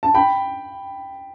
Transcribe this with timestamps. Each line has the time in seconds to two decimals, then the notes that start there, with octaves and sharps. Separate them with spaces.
0.03 A5
0.14 G5 B5